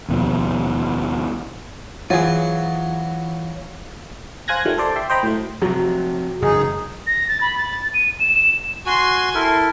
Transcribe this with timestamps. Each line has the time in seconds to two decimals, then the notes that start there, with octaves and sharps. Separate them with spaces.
0.08 D#2 B2 F3
2.10 E3 F#3 F4 G#4 C5
4.48 C5 F5 G#5 F#6 G#6 A#6
4.65 D#3 F3 G3 A3
4.78 A4 C5 D5 C6
4.96 E5 G5 C6
5.10 C5 D#5 G5 A#5 B5
5.23 A2 F#3 A3
5.62 C3 F3 F#3
6.42 E1 F#2 C#3 D#4 G#4
7.07 A#6
7.28 A6
7.41 B5
7.58 A6
7.94 D#7
8.20 E7
8.86 F#4 G#5 C6
9.35 E4 A4 A#4